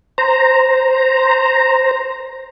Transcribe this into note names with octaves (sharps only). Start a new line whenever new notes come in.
C5 A#5